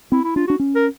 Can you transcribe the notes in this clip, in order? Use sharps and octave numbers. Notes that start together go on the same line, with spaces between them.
C4 E4
E4
D4 F4
D4 F#4
C#4
A#4